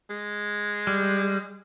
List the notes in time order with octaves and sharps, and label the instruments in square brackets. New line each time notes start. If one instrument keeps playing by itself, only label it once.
[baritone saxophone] G#3
[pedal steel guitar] G3